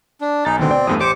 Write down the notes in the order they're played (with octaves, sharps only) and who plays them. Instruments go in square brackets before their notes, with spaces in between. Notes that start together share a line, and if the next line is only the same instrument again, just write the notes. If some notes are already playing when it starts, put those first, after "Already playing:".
[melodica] D4
[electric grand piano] B1 A6 [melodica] D#4 [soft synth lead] G#5
[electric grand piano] D2 B2 D3 [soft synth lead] D#3 [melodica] C4
[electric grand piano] B2 G5 [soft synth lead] D5
[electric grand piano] E2 G2 A3 [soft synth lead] D#6
[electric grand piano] A1 G4 D7 [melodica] C5 D6 [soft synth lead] C#7